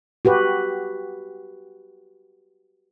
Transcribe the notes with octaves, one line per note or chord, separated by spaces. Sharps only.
F#4 G4 B4